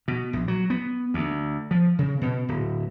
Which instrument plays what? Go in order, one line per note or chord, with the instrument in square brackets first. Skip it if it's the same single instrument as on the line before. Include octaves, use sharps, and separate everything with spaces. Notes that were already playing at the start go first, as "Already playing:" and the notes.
[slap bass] B2
A#1
F#3
B3
D2
F3
C#3
B2
D1